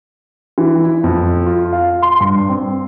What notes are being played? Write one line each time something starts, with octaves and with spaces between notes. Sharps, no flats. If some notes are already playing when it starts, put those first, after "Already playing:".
E3
E4
F2
F4
F5
C6
G2
C4